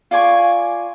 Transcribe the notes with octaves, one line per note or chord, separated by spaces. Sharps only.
F4 D5 G#5 C#6